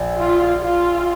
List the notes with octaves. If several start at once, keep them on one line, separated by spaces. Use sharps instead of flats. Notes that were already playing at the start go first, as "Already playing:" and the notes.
Already playing: A#1
F4
F4